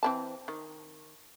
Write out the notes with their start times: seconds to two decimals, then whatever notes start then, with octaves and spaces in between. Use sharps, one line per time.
0.03 E3 C4 A5
0.48 D#3